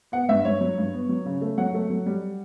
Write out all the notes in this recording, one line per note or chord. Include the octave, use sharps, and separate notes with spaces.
B3 F#5
G2 E5
G2 C#5
F#3
G2
B3
F#3
C#3
A3
F#3 F#5
A3
F#3
G3